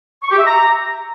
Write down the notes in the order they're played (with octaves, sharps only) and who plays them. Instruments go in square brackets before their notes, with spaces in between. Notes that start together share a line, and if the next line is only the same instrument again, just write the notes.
[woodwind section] C#6
G4
E5
A#5